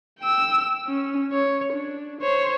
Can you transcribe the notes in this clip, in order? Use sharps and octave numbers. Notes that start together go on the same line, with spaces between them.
G5 E6
C#4
C#5
D4
C5 C#5